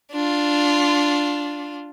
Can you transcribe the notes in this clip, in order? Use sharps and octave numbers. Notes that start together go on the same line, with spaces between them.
D4 F4